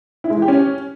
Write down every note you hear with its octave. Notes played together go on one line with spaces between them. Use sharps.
E4
G#3
E3
G4
C#4